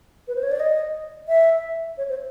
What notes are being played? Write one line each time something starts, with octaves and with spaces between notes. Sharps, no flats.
B4
C5
C#5
D5
D#5
E5
C#5
C5